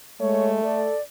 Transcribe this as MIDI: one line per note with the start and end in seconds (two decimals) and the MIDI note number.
0.20 0.63 56
0.20 0.88 57
0.20 0.50 73
0.63 0.96 69
0.63 1.01 74